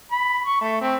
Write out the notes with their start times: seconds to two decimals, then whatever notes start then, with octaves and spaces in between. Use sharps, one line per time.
0.12 B5
0.46 C#6
0.61 A3
0.81 C4